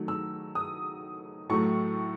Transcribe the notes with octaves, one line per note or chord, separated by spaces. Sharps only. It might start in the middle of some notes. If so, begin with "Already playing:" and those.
Already playing: D#3 F#3 A3
E6
D#6
A2 F#3 A3 C#6